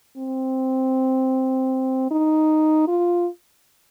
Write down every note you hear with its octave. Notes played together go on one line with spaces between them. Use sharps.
C4
D#4
F4